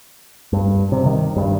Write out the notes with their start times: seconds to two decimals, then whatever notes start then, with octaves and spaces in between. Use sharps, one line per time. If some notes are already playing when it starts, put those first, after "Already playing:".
0.53 G2
0.92 C3
1.06 D#3
1.36 G2